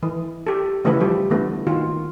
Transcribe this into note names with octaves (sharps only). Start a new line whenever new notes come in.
E3
G4 A4
C#3 E3 A3 E4 A4 B4
F3 G3 G4
D3 E3 A3 B3
D#3 F4 F#4